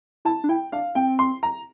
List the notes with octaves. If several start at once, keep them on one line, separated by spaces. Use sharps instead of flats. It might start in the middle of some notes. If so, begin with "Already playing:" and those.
E4 A5
D4
E4 G5
D4 F5
C4 G5
C6
A#5